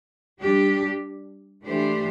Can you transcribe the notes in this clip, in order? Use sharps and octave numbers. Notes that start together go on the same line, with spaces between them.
G3 D4 G4
E3 A3 D4 G4 C5